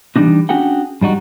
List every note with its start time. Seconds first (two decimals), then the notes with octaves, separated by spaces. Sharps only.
0.16 E3 G3 A#3 D4 D#4
0.49 C#4 D4 F#4 G#4 F#5 G5
1.01 G2 G3 D#4 F#4